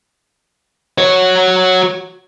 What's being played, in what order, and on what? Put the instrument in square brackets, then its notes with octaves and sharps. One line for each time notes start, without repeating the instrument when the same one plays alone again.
[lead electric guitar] F#4 C#5